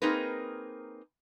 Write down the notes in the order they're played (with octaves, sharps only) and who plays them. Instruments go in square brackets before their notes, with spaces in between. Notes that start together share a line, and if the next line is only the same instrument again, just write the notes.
[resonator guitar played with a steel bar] A#3 C4 D#4 G#4 A#4 B4